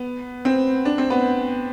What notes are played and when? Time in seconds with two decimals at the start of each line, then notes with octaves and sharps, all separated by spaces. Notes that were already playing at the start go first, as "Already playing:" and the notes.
Already playing: B3
0.45 C4
0.85 D4
0.98 C4
1.10 B3